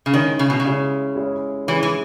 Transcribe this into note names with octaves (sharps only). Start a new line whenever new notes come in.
C#3
D#3 G#3 C#4 E4 G#4 C#5
C#3
B2
C#3
G#3 C#4 E4 G#4 C#5
G#3 C#4 E4 G#4 C#5
E3 G#3 C#4 E4 G#4 C#5
E3